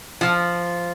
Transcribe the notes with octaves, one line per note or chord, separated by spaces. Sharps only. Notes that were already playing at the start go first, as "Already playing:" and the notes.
F3